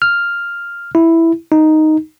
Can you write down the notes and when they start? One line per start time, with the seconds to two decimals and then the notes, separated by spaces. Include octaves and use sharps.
0.02 F6
0.95 E4
1.52 D#4